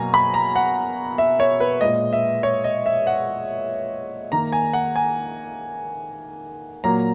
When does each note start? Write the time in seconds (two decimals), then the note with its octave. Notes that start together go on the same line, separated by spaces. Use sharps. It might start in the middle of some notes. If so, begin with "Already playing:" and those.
Already playing: B2 F#3 A#3 G#5 A#5
0.14 B5
0.34 A#5
0.56 F#5
1.18 E5
1.40 C#5
1.60 B4
1.81 A#2 G#3 D#5
2.13 E5
2.43 C#5
2.64 D#5
2.86 E5
3.07 F#5
4.32 D#3 A#3 A#5
4.52 G#5
4.73 F#5
4.96 G#5
6.84 A#2 F#3 A#3 A#5